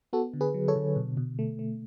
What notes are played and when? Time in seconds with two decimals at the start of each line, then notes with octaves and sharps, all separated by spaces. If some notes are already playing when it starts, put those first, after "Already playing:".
0.13 B3 F#4 A4
0.34 D3
0.41 G#4 B4
0.54 F#3
0.68 A4 C#5
0.76 D3
0.96 B2
1.17 B2
1.39 A3
1.59 A3